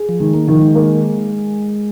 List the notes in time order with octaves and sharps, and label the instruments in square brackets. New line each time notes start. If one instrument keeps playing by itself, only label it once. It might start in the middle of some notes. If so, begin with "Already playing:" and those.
Already playing: [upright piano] G#4
[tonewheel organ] F3
[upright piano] D#3 [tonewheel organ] G#3
[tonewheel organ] A#3
[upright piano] D#3 [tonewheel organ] F3
[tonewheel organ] G#3
[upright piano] A#3